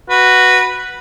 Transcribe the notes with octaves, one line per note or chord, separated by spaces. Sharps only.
F#4 B4